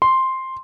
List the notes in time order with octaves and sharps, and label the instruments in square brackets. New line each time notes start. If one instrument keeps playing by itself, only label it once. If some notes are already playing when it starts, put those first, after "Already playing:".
[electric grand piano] C6